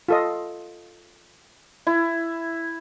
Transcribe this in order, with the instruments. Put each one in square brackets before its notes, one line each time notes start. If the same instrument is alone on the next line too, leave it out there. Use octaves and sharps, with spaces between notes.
[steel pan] F4 A4 D#5
[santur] E4